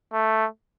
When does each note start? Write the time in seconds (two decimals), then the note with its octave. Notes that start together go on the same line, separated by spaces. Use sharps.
0.13 A3